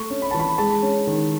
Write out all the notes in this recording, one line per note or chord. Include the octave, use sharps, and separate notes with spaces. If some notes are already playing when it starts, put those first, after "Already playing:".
Already playing: A3 C#6
C#4
B5
E3 A5
B5
G#3 A5
C#4
D#3